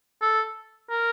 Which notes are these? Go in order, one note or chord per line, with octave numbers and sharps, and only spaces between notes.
A4
A#4